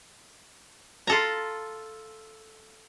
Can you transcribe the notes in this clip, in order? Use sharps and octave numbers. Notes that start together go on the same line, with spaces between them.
F4 A4 A#5